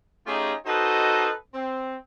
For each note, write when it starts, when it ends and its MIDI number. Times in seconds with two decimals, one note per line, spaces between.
0.26 0.53 57
0.26 0.53 61
0.26 0.53 63
0.26 0.53 65
0.26 0.53 67
0.26 0.53 68
0.67 1.31 63
0.67 1.31 66
0.67 1.31 69
0.67 1.31 71
0.67 1.31 72
0.67 1.31 75
1.54 1.96 60